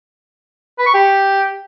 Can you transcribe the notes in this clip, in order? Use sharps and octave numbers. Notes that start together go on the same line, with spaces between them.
B4
C#6
G4